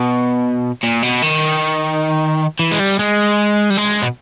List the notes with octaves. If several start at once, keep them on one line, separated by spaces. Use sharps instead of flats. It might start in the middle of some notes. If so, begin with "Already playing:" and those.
Already playing: B2
A#2
B2
D#3
E3
G#3
G3
G#3
G3
G#3
B2